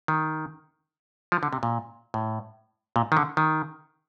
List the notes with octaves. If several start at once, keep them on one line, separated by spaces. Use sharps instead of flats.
D#3
F3
D3
C3
A#2
A2
A#2
D#3
D3
D#3